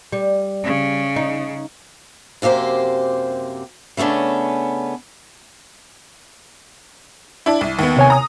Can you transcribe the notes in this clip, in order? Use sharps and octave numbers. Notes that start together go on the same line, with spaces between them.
G3
C#3
D#4
F#2 C3 A#3 G4 C5
C#3 A3 B3 C#4 D4
D4 E4
C2
D#2 B3
C3 C#5 G#5
A#5 D#6